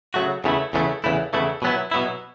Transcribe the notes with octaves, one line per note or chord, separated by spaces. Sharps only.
C#3 F#3 A3 F#4
E2 C#3 E3 A3 E4
E2 C#3 E3 A3 E4
E2 C#3 E3 A3 E4
E2 C#3 E3 A3 E4
B2 F#3 B3 E4
B2 F#3 B3 E4